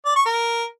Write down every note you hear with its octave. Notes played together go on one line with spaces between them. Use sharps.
D5
C#6
A#4